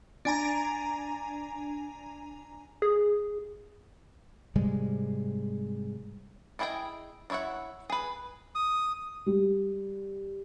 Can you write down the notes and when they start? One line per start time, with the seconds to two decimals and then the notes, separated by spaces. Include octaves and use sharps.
0.25 D4 G#5 A#5
2.82 G#4
4.55 G#2 C3 G3 G#3
6.59 D4 E4 G#4 D#5 G5
7.30 D4 E4 C#5 E5 F#5
7.90 G#4 B4
8.55 D#6
9.26 G3